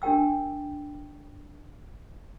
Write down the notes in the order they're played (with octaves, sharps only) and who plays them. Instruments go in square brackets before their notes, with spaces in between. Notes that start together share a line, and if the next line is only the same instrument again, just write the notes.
[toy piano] D4 G4 A#4 G5 E6